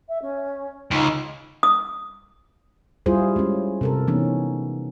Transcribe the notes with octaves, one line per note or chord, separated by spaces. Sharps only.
E5
C#4
C#2 D#4
D#6
G3 E4 F4 G#4 C5
G#3 C#4
C3 A4 A#4
E3 B3 C#4 D#4